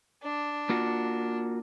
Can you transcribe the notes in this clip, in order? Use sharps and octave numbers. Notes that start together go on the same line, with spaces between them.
D4
A#3 F4 F#4